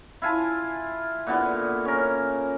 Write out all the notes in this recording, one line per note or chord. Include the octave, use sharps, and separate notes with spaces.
E4 F4 G#5 A5
A#2 D3 B3
C#4 A#4